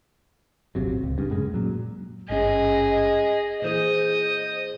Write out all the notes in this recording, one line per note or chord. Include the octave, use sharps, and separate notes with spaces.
D#1 G#1 C3 F#3
C#2
G2 C#3
F#2 A2 C#3 G#3
A#2 F#3
G#1 G2 C#4 G#4 D#5
A#2 E3 G#4 C5 D#5